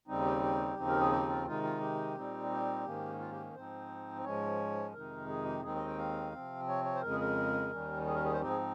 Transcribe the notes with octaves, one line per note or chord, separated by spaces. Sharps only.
D#2 C#3 G3 C4 D#4
G4
G4
D#2 C#3 F3 C4 D#4
A#4
G#4
G4
F4
C3 D#3 G#3 D#4 F4
F4
G4
A#2 G3 C4 D#4
G4
G#2 D#3 A#3 C#4
F4
G4
G#2 F3 C4 D#4 C5
G#2 F3 G#3 C#4 C#5
F2 C3 D#3 G#3 D#4 A#4
G#4
G4
D#2 D#3 G#3 C4 D#4 G#4
D#5
G5
F5
C3 F3 C4
C#5
C#5
C5
F2 C#3 G#3 A#4
G#4
A#4
D#2 D#3 G3 C#4
G#4
A#4
G#4
C5
G#2 F3 C4 D#4 G4
G#4